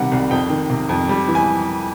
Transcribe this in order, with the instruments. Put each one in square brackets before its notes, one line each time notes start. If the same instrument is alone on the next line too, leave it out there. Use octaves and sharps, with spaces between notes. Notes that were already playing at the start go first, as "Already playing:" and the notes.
Already playing: [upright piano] C3 D#3 G3 F#5
C2
F2 G5
D#3
C3
F2
G3
E3
G#5